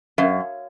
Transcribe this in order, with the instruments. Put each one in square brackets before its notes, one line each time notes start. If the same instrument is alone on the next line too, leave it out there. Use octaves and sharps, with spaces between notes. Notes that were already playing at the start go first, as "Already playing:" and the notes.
[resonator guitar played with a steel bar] F#2 [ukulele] A#4 C#5 F5